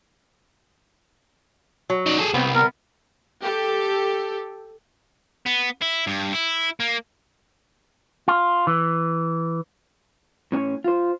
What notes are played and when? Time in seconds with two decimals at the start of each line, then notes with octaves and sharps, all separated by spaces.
1.90 F#3
2.06 D#4 D5
2.18 G#4 A4
2.34 C2 B3 C4
2.55 B3 A#4
3.42 G4 A4
5.46 B3
5.82 E4
6.07 G2
6.33 E4
6.80 A#3
8.28 F4
8.67 E3
10.52 A2 C#4 D4 C#5
10.84 F4 C5